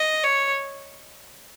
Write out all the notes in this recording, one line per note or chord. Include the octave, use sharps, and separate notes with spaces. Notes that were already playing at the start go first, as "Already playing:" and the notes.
Already playing: D#5
C#5